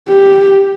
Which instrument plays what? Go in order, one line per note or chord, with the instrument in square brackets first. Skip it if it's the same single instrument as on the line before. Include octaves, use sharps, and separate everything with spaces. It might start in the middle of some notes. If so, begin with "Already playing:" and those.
[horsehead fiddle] G4